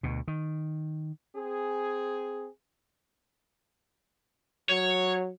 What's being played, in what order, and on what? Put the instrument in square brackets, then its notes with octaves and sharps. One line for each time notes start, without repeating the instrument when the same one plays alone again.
[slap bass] D2 B2
D#3
[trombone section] C4 G#4
[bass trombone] F#3 [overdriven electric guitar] C#5